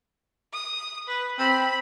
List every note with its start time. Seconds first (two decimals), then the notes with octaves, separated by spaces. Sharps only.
0.53 D#6
1.08 B4
1.39 C4 B5